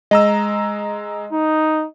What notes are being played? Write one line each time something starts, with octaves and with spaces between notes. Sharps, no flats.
G#3 D#5 A#5 E6
D#4